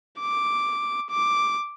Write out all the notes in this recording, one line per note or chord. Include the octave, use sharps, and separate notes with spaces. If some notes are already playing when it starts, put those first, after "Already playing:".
D6
D6